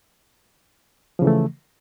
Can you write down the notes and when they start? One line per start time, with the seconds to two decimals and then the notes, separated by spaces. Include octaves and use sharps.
1.19 F3
1.22 C#3
1.25 E3
1.27 A3